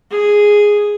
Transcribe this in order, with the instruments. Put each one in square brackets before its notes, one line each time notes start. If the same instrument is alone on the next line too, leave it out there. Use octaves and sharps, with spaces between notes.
[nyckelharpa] G#4